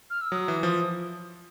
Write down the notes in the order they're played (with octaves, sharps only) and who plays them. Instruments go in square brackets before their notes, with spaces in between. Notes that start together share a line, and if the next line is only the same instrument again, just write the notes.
[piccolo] F6
E6
[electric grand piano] F#3 [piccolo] D#6
[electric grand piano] E3
F3